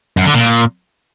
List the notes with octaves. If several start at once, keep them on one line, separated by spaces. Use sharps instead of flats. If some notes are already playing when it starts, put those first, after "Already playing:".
F#2
D3
A#2